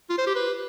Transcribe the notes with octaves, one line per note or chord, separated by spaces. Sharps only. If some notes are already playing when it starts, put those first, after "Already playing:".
F4
C5
G4
B4